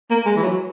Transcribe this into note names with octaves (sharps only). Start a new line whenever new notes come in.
A#3
G#3
E3
F#3